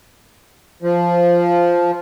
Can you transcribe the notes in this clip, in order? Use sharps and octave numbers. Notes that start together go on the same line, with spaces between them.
F3